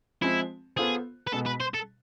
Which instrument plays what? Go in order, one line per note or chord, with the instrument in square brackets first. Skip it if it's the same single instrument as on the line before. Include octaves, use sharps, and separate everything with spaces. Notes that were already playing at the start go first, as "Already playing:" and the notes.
[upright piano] F3 G#3 C4 [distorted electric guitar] E4
[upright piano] B3 F4 A4 C5 [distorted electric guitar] G#4
[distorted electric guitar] B4
[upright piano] B2 G#3 B3 [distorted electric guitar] A4
[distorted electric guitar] B4
C5
A4